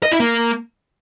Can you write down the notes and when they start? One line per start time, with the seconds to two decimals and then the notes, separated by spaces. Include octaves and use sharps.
0.03 D#5
0.12 E4
0.20 A#3